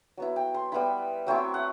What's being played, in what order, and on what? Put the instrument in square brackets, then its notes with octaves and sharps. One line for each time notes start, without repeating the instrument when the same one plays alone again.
[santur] F#3 B3 E4
G5
C6
G3 B3 E4 B5
F#3 A3 C4 E4 G5
F#5